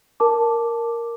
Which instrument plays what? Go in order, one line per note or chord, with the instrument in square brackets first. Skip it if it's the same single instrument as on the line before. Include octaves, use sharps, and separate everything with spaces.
[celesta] A#4 A5 D6